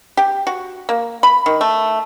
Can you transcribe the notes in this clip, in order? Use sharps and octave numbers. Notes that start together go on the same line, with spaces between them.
G4
F#4
A#3
B5
D#3
A3